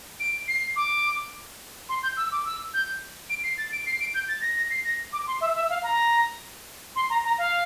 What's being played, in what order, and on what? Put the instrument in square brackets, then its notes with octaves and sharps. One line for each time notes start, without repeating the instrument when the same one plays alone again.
[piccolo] D7
C7
D6
C6
G6
E6
D6
E6
G6
D7
C7
A6
D7
C7
D7
G6
A6
A#6
A#6
C7
A#6
D6
C6
E5
E5
F5
A#5
C6
A#5
A#5
F5